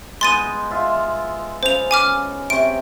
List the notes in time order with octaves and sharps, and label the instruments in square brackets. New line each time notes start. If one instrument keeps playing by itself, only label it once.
[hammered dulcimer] G#3 B3 D#4 [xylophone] C6 A6 D#7
[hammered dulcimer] F4 E5
[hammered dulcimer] C#3 [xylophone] C5 F7
[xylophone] G#5 D6 F6
[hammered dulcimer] C3 C#6 [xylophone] D7